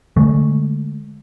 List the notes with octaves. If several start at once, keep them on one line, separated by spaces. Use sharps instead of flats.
D3 G#3 A3